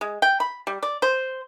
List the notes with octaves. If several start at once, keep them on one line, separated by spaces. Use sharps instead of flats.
G#3
G5
B5
G3
D5
C5